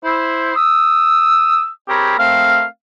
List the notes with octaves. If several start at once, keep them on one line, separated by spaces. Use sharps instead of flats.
E4 C5
D#6 E6
C4 G4 G#4 A#4 C#5 B5
A3 C4 A#4 F5